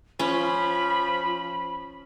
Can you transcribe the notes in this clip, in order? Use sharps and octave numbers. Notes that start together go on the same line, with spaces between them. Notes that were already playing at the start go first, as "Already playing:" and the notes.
F3 C#4 B5